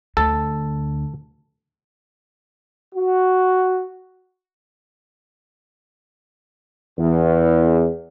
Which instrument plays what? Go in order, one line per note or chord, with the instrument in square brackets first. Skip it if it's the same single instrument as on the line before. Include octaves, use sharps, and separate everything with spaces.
[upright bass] D2 [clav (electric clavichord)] A4
[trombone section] F#4
[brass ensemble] E2